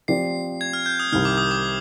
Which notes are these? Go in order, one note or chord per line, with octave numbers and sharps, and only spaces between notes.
F3 C4 G4 D5 C7
G#6
F6
G6
D#6
C2 C3 D#3 F6
D6
D#6
D6